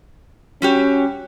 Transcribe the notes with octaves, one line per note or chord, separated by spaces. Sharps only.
G3 C#4 F#4 G4